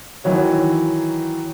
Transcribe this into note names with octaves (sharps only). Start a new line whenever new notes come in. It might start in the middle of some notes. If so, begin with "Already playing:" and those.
D#3 E3 F#3 C#5